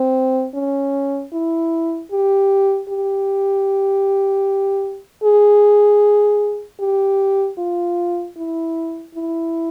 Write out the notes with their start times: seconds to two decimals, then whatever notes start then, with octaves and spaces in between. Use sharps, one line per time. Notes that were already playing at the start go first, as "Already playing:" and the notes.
Already playing: C4
0.55 C#4
1.33 E4
2.11 G4
2.89 G4
5.24 G#4
6.80 G4
7.58 F4
8.37 E4
9.15 E4